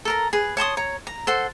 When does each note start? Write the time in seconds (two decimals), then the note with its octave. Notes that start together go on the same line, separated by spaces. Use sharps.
0.05 A4 A#4 A#5
0.33 G#4 B4
0.57 C#5 A5 C6 D#6
0.77 C#5 A#5
1.07 A#5
1.27 A4 C5 F#5